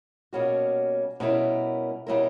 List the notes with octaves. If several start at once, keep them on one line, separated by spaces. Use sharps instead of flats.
B2 G3 A#3 C#4 F#4
B2 G3 C#4 E4 A#4
B2 G3 C#4 E4 A#4